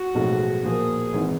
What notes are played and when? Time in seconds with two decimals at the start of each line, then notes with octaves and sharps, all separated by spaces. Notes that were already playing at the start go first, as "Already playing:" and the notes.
Already playing: F#4
0.15 B1 A2 F3 G#3
0.63 A#2 F3 A#3 G#4
1.13 G#1 G#2 E3